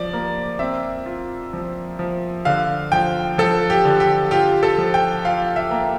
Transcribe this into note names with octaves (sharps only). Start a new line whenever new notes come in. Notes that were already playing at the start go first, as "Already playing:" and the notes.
Already playing: F3 D5
A#3
C4 E5
F4
F3
F3
D3 F5
F3 G5
F3 A4
G4
D3
G4
F4 G4
A4
F3
G5
F4 F5
E5
A#3